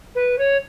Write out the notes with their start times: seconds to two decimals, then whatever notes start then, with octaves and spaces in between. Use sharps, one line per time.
0.15 B4
0.38 C#5